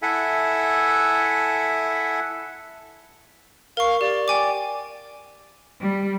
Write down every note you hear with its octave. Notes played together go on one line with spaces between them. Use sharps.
E4 A4 E5 F#5 G#5
A#4 F5 C#6
G4 D5
G5 G#5 D6
G3